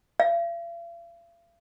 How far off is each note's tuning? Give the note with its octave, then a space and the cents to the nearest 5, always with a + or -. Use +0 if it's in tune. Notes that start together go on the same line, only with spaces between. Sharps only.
F5 -45